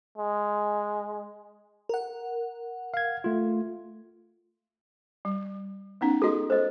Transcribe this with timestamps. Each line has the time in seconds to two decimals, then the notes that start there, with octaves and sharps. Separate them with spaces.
0.18 G#3
1.89 A#4 F#5
2.94 F5 G#6
3.24 A3 F4
5.25 G3
6.01 B3 C#4 D#4
6.22 F#4 G#4 A4 D#5
6.50 A4 C5 D#5